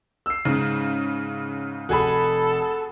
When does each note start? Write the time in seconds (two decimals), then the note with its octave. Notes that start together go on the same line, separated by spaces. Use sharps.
0.26 E6 C7
0.45 G#2 C#3
1.89 F1 F#4 G#4 A4 B5